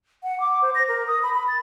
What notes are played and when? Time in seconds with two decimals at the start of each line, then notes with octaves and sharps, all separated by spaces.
0.23 F#5
0.40 D6
0.62 C5
0.75 A#6
0.88 A#4
1.07 D#6
1.23 B5
1.34 B5
1.48 A6